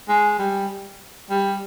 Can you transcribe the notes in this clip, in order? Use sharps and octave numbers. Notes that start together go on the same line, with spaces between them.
G#3
G3
G3